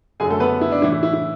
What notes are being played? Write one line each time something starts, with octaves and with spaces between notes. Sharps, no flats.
F#2 D3 F#3 G#4 G#5
A3 A4
B3 B4
E4
D4
A2 E3 E4
E4
E4
E4